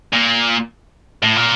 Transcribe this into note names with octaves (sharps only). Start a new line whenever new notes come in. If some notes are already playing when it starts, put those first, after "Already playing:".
A#2
A2
A#2